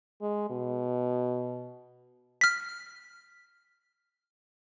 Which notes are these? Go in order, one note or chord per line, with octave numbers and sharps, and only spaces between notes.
G#3
B2
F6 B6